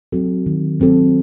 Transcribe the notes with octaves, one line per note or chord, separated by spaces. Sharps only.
F#3 C4 F#4 A4
D#3
F#3 C4 F#4 A4